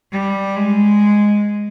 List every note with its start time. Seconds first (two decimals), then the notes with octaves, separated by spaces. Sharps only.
0.12 G3
0.56 G#3